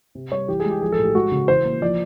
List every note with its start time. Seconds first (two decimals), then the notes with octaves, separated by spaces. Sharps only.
0.15 C3
0.32 G3 C#5
0.48 E3 G4
0.60 G#4
0.65 G#3
0.71 G4
0.82 F3 G#4
0.92 A4
0.99 A2
1.04 G4
1.15 G#3 F#4
1.32 C#3
1.48 E3 C5
1.65 A#3
1.82 F3 D5